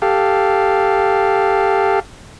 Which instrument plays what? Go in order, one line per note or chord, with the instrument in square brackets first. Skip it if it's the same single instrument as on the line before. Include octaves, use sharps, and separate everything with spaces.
[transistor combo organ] G4 A4 F5